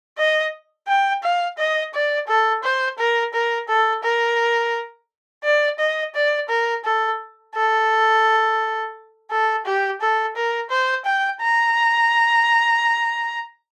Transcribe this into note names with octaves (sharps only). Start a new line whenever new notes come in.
D#5
G5
F5
D#5
D5
A4
C5
A#4
A#4
A4
A#4
D5
D#5
D5
A#4
A4
A4
A4
G4
A4
A#4
C5
G5
A#5